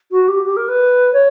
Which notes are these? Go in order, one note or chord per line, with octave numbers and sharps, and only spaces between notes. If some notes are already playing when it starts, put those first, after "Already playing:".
F#4
G4
G4
A#4
B4
C#5